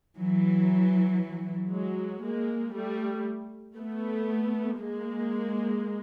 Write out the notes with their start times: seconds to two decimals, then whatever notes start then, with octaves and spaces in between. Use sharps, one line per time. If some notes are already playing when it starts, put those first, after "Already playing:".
0.18 E3 F#3
1.72 F#3 G#3
2.23 G#3 A#3
2.74 G3 A3
3.76 A3 B3
4.79 G#3 A#3